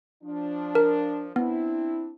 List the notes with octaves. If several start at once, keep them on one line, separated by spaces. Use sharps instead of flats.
F3 D4
A#4
B3 C4 D4 E4